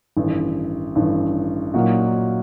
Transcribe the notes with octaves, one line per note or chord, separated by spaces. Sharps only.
A1 G2 D#3
A1 G2 D#3
A#2 F#3 A#3 D#4 F#4